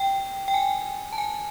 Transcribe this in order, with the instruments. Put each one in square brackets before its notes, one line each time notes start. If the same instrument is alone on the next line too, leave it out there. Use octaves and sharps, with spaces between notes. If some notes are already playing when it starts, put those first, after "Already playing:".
Already playing: [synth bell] G5
G5
G#5
A5
G#5